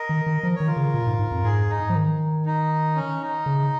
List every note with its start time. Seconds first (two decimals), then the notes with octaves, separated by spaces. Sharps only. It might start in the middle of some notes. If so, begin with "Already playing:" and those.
Already playing: A#4 D#5
0.09 D#3
0.26 D#3
0.43 F3 A#4
0.56 D#3 C#5
0.67 F4 A#4
0.76 C#3
0.94 A#2
1.07 G#2
1.19 G#2
1.32 F2
1.44 G#2 G#4
1.70 D#4
1.90 F3
1.95 D#3
2.46 D#4
2.96 C#4
3.21 D#4
3.46 C#3